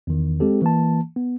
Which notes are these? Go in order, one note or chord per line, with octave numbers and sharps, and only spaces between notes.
E2 D#3
G#3 C4 G4 A4
E3 A#3 A5
B3